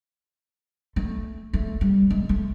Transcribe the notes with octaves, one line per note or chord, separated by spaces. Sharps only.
A3
A3
G3
G#3
A3